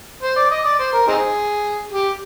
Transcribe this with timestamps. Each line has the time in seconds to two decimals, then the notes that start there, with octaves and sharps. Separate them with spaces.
0.23 C5
0.36 D5
0.51 D#5
0.65 D5
0.79 C5
0.93 A#4
1.08 C4 D#4 G#4
1.92 G4